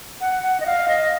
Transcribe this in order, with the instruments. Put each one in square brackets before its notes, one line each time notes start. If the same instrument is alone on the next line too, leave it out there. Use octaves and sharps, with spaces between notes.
[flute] F#5
F#5
D#5
F5
D#5